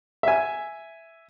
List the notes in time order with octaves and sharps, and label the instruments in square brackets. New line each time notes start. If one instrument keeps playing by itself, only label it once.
[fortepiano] E5 G#5